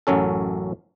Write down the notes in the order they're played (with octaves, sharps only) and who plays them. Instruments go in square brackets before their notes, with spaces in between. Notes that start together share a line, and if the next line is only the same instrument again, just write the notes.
[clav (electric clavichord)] A1 F#2 F#3 C#4 A4